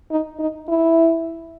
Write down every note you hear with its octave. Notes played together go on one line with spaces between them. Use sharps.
D#4
D#4
E4